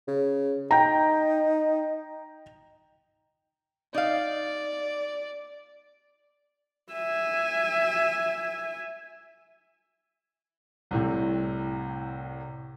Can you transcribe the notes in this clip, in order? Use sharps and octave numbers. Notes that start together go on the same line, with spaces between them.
C#3
D#4 G5 A#5
D#4 D5 F5
E5 G#5
C2 A2 C3